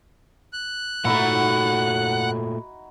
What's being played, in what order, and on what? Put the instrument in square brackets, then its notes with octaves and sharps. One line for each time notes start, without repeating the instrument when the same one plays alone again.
[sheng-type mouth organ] F#6
[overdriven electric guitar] A#2 A3 [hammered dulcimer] D#4 E4 F#4 [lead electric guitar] F#5